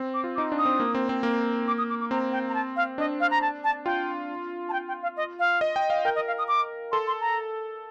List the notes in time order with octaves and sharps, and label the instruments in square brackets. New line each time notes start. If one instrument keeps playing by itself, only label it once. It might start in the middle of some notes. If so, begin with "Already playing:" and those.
Already playing: [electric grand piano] C4
[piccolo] D6
[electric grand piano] F4
[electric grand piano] D#4 [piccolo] D6
[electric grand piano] D4
[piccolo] D#6
[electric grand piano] C4
A#3
C4
C4
A#3
[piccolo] D6
D#6
D6
D6
[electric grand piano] C4 [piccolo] A#5
[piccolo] G5
A#5
A5
F5
[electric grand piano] D4 [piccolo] D#5
[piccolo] F5
A#5
A5
A5
[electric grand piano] F4 [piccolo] G5
[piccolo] A5
G5
G5
F5
D#5
F5
[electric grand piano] D#5
G5
F5
[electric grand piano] A#4 [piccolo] G5
[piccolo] D#5
F5
D#6
D6
[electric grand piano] A4 [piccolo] C6
[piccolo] C6
A#5